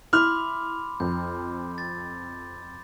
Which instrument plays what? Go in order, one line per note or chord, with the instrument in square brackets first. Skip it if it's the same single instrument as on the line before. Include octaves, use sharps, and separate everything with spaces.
[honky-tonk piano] E4 [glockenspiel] B5 C6 D6 [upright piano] F6
[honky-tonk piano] F2 [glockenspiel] G6
[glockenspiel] A6